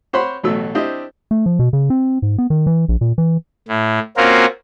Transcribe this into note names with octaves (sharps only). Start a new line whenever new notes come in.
C4 C5 C#5 F#5 B5 C6
A1 B2 F#3 A3 E6
C4 D4 E4 G4 C5 D#5
A3
F3
B2
C#3
C4
G#2
B3
D#3
E3
A#1
A#2
E3
A2
A#3 C4 C#4 F4 F#4 A#4